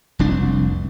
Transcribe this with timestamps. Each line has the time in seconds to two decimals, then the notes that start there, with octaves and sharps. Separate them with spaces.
0.19 F1 C2 D4